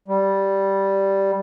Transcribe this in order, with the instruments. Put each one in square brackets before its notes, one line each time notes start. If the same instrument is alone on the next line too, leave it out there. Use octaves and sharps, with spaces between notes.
[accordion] G3